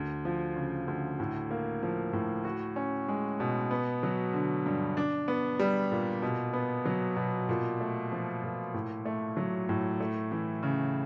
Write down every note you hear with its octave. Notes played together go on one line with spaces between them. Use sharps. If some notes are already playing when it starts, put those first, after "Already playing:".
Already playing: D2
F3
C#3
D2
A2
A#3
F3
A2
F#4
C#4
G#3
B2
B3
F#3
D3
G2
D4
B3
G3
A#2
B2
B3
F#3
B2
A#2
A3
F3
A#2
A2
A3
F#3
A2
A3
E3
C#3